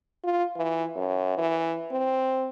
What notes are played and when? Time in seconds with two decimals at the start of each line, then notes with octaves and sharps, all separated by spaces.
0.24 F4
0.56 E3
0.96 F#2
1.37 E3
1.92 C4